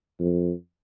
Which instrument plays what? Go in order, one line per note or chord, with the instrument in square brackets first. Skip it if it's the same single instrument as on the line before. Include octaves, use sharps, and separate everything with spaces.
[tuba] F2